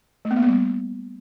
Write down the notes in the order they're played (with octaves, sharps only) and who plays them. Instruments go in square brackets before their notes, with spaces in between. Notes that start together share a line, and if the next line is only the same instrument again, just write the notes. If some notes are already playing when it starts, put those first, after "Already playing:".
[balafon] A3
B3
A#3
B3
G3